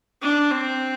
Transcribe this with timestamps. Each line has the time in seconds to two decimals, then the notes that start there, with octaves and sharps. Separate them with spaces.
0.22 D4
0.51 C4